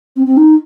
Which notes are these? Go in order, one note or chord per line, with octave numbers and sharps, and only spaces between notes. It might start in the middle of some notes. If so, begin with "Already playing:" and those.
C4
C4
D#4